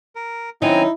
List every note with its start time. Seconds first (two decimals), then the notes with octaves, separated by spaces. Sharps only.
0.16 A#4
0.62 D#3 F#3 C4 C#4 D#4 E4 G#5 A#5